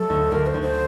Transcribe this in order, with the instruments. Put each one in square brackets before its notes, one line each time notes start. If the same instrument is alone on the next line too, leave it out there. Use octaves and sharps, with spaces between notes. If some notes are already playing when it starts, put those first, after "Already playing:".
Already playing: [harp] F#3 A3 [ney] A4
[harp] D2
[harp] D2 [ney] A#4
[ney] C5
[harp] D2
[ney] C5